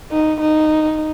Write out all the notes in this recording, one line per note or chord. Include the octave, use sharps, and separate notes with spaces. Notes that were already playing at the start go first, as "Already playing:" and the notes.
D#4
D#4